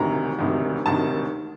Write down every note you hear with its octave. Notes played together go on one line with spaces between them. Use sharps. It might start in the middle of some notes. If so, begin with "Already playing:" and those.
Already playing: E1 D2 C3 D#3 A#5
E1 D2 C3 D#3
E1 D2 C3 D#3 A5